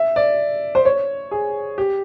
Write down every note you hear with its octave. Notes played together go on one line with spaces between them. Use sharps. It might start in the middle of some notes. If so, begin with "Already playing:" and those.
Already playing: E5
D5
C5
C#5
G#4
G4